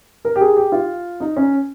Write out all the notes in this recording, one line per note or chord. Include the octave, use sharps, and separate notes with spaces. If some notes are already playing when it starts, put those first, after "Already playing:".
A#4
G4
G#4
G4
F4
D#4
C#4